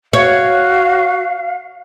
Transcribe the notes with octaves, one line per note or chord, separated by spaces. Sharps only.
F#4 C#5 F5